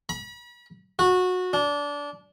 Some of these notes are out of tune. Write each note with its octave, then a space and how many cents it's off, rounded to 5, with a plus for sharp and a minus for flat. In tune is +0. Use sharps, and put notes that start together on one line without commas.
B5 -40
F#4 -20
D4 -20